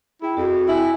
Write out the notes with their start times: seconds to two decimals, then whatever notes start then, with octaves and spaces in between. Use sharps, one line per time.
0.22 E4 G#4 G5
0.37 F2 F#4
0.68 E4 G#5